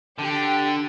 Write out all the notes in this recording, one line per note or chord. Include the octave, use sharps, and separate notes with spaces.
D3 G4 G5